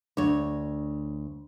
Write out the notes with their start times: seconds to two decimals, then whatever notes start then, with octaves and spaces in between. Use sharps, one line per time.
0.17 D2 D4 C#5